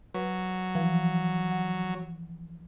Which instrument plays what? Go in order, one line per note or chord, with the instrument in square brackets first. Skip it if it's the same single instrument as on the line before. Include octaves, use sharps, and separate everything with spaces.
[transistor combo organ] F#3 [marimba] B4
[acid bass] E3 [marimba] F3
[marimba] F#5